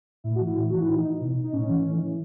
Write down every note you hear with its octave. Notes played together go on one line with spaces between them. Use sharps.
A2 E4
F#4
E3
E4
A2
E3 F#4
E4
A2 D#4
E3
B2
D#4
A2 C#4
E3
A2
E3